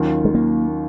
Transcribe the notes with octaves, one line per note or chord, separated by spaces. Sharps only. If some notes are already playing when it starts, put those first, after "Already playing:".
Already playing: D#2 D#3 F#3 C#4 F4
G#3
A#3